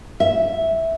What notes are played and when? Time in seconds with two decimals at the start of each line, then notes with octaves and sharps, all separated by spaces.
0.20 E5